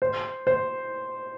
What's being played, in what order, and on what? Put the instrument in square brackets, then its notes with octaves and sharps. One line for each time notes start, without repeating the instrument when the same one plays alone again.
[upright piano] C5
C5